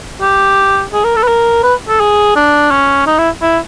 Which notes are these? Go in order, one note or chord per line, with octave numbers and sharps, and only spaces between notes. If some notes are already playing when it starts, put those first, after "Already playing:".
G4
G#4
A#4
A4
B4
A#4
B4
A4
G#4
D4
C#4
D#4
E4
E4